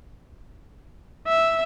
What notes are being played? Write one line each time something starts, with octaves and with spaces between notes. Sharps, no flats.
E5